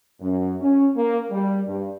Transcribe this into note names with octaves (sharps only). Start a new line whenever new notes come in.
F#2
C#4
A#3
G3
G2